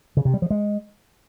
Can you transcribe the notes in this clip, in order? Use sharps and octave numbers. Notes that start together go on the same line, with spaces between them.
C#3
C3
G3
F3
G#3